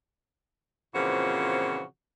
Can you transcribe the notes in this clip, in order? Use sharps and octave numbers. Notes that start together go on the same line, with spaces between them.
A#2 C#3 E3 F3 C4 F#4